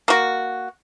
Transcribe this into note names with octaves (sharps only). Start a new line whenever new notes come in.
A#3 F#4